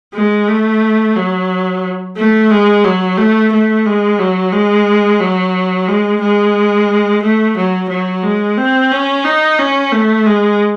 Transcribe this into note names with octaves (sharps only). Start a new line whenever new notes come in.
G#3
A3
F#3
A3
G#3
F#3
A3
A3
G#3
F#3
G#3
F#3
G#3
G#3
A3
F#3
F#3
G#3
C4
C#4
D#4
C#4
A3
G#3